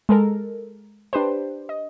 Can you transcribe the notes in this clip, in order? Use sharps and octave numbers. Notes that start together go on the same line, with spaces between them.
G#3 A4 A#4
D4 G4 B4 C5
D#5